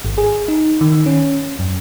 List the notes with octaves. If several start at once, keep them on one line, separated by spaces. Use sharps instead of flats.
G#1
G#4
D#4
D#3
C#4
F#2